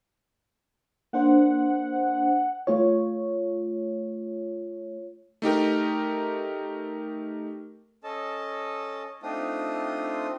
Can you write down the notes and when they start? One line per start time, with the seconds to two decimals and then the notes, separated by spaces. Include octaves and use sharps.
1.13 A#3 D4 C5 F#5
2.67 A3 F4 C#5
5.42 A3 D#4 G4 A#4
8.04 C#4 A4 D#5 A5
9.23 A3 C4 D4 D#4 F4 D#6